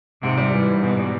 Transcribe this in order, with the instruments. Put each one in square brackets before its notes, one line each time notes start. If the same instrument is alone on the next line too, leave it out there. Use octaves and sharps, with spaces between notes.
[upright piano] G#2 [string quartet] C3
[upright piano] G3
E3
G#2
[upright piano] G#2 [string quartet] B2
[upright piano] G3